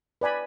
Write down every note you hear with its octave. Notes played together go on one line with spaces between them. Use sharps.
B4 D5 G#5 B5